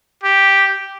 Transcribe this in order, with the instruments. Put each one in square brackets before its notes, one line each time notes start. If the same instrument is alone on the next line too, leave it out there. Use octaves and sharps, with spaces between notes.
[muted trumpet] G4